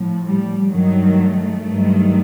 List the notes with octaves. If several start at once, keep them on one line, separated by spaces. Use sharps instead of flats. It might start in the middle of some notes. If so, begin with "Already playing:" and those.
Already playing: A2 F3
G3
G2 D#3 F#3 A3
G2 D#3 F#3